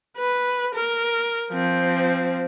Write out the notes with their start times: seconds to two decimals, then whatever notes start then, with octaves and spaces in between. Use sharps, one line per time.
0.17 B4
0.75 A#4
1.52 F3 C4